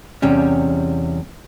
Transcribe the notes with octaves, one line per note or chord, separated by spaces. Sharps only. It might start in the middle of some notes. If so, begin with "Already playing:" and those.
E2 C3 G3 C#4